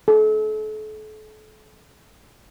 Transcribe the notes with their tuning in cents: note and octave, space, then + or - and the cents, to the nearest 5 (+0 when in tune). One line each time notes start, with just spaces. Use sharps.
A4 -40